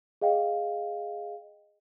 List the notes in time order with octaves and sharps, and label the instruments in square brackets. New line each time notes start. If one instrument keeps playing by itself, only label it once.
[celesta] G#4 D#5 F5 G5